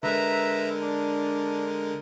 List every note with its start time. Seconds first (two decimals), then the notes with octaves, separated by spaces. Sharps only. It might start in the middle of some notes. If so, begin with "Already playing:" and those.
0.03 D3 G#3 A#4 B4 E5 A#5
0.81 D4